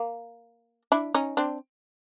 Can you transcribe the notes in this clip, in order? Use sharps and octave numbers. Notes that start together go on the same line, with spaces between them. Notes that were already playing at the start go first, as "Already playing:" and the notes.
Already playing: A#3
D4 E4
C#4 D#4
C4 D4